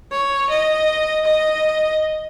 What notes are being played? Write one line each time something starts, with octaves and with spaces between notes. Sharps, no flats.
C#5
D#5
D#5